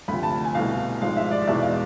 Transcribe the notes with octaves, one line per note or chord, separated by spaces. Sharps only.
D2 C3 F3 B5
A5
G#5
C2 B2 A3 F5
G#1 G#2 F3 G#3 F5
E5
D5
D5
E2 B2 G#3 E5
F5